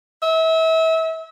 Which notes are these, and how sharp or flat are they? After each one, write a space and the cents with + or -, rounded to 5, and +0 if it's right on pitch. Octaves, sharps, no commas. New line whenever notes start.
E5 -30